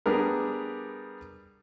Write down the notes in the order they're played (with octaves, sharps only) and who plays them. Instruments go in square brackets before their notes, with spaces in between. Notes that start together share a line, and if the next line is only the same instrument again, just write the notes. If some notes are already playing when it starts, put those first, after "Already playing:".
[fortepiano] G3 B3 D4 G#4 A#4